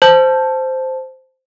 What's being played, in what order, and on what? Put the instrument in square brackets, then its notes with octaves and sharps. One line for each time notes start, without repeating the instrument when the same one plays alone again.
[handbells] C5 A5 G6